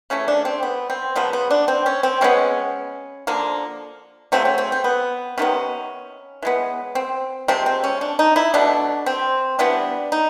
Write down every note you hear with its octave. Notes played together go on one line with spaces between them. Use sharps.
C#3 E3 A3 C#4
D4
C4
B3
C4
C#3 F3 A#3 B3
B3
D4
C4
C#4
C4
E3 G#3 B3 C#4
D3 F3 A#3
C#3 F#3 A3 C4
C#4
C4
C4
B3
C3 D#3 F#3 B3 C#4
E3 G#3 B3
C4
C3 F3 G#3 C4
C4
C#4
D4
D#4
E4
B2 F#3 A3 D4
C4
E3 G3 B3 D4
D#4